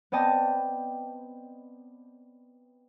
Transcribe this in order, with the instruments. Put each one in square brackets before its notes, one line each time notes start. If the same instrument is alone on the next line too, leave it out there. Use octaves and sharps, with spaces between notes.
[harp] B3 C4 D5 D#5 G5 A5